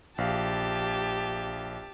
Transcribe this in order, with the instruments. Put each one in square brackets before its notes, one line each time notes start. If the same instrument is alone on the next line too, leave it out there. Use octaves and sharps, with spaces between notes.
[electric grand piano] A#1 F5 [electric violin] G4 A5